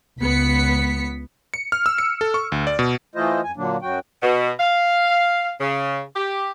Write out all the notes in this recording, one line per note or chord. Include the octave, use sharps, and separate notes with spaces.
C#2 B3 B6 C#7
C#7
F6
E6
C#7
A4
C#6
D2
D5
B2
E3 A3 E4 F4 C5 D#5
F2 G#5
A#2 D3 F#3 A#3 D4
F#2 F#3 F#4 G5
B2
F5
C#3
G4